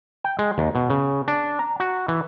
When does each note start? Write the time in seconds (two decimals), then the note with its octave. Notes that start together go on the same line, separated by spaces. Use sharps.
0.24 G5
0.39 G#3
0.58 D#2
0.75 B2
0.90 C#3
1.28 D4
1.59 A#5
1.80 F#4
2.08 E3